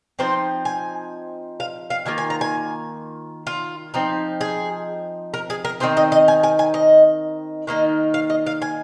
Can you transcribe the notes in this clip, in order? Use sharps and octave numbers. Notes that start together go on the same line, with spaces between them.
F3 C4 D#4 C5
G#5
F5
F5
D#3 A#3 F4 G#5
G#5
A#5
G#5
F4
F3 C4 D#4
G#4
A#4
G#4
A#4
D#3 C4 D#4 C5
D#5
D#5
G#5
G#5
G#5
D#5
D#3 A#3 D#4 D#5
F5
D#5
F5
G#5